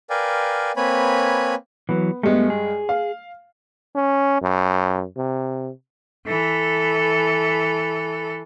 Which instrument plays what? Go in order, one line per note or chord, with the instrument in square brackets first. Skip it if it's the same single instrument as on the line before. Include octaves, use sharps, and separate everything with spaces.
[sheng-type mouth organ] A#4 B4 D5 F5 G5 G#5
A#3 C4 B4 C#5 G#5 B5
[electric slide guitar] E3 F#3 [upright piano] B3
[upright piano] G2 G#3 [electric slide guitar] A3 B3
[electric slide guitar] G#4
[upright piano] F5
[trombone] C#4
F#2
C3
[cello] E3 A4